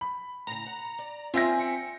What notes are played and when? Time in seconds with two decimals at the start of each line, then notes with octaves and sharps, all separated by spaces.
0.01 B5
0.47 A2 C#3 A#5
0.66 F#5
0.99 D5
1.34 C4 C#4 D#4 F4 E5 G#5 A#6
1.59 G5 C#7